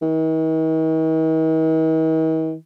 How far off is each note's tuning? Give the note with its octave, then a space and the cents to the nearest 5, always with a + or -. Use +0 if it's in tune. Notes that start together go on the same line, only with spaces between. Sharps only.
D#3 +45